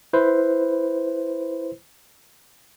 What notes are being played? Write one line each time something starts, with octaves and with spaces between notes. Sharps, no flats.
E4 B4 C5